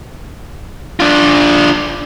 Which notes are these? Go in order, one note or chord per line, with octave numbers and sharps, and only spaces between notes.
D4 F4